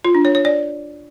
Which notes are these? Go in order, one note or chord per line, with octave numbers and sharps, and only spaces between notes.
F4
D4
C#5
C#5
D5